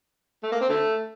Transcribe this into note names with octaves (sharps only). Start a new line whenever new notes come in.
A3
A#3
C4
D3 A3